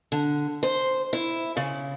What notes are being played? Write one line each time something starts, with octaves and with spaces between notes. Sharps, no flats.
D3
C5
E4
C#3